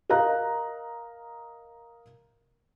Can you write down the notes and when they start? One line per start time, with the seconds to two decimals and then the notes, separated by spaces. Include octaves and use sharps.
0.09 A#4 D#5 F5 A#5 F#6